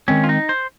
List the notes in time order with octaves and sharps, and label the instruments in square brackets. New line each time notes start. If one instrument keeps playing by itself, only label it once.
[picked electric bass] D#3 G#3 C4 [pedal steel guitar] C#4
[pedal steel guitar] F4
D#4
C5